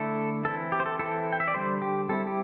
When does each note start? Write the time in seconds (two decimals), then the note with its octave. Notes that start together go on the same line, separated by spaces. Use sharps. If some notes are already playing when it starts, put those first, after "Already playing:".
Already playing: D3 A3 E4 A4
0.45 E3 C4 E4 A4
0.72 G4
0.80 C5
0.86 A4
0.99 E3 C4 E4 A4
1.33 G5
1.40 E5
1.48 D5
1.54 D3 G3 D4 C5
1.82 G4
2.09 G3 C4 E4 A4
2.27 G4